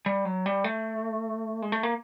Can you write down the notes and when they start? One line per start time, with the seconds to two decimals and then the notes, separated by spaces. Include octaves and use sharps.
0.06 G3
0.25 F#3
0.46 G3
0.64 A3
1.62 G#3
1.72 A3
1.83 A#3